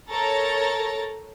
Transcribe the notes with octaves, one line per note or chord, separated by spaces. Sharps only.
A4 A#4 C#5 A#5 A6